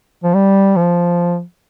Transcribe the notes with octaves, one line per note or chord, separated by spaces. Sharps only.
F3
G3
F3